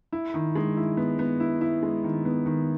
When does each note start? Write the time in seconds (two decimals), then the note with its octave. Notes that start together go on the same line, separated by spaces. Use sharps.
0.12 E4
0.34 D#3
0.56 G#3
0.77 E4
0.97 B3
1.19 B3
1.40 E4
1.61 E4
1.83 G#3
2.04 D#3
2.25 B3
2.46 D#3